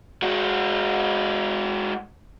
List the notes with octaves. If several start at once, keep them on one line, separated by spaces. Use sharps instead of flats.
G#3 F#4